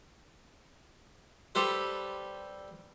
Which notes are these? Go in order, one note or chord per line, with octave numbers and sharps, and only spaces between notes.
G3 G4 A4 B4 C5